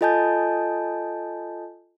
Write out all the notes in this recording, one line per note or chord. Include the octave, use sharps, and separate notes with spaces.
F4 A4 D#5 G#5 A5 G6